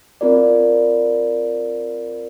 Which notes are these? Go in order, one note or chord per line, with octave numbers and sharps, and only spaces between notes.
C4 F4 A#4 D5